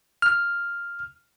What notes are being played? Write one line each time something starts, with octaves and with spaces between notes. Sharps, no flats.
F6